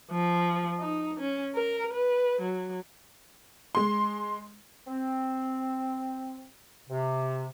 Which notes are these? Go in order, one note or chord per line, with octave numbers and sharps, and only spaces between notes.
F3
D#4
C#4
A#4
B4
F#3
G#3 C6
C4
C3